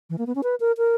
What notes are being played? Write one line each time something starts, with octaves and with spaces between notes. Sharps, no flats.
E3
A#3
B3
C#4
B4
A#4
A#4